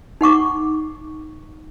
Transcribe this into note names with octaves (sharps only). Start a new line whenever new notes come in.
D#4 F#5 C#6 D6